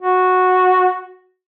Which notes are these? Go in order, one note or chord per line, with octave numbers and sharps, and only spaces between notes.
F#4